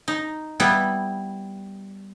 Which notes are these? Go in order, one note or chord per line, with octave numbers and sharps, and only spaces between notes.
D#4
G3 B3 E4